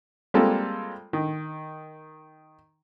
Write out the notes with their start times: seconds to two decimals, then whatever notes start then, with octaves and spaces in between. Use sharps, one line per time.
0.34 G3 G#3 A#3 C4 F4 A4
1.13 D#3